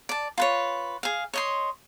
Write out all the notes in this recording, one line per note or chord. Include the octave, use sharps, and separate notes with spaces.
D5 A5
F4 B4 C#5
G#4 F5
C#5 D#5 C6